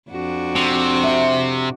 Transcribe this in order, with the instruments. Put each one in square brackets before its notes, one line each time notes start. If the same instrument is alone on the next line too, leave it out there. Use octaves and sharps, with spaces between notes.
[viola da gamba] F2 D4 F#4
[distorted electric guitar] C3 [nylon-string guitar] G4
[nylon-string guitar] E5